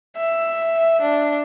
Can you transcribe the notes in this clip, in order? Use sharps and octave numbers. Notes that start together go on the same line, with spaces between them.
E5
D4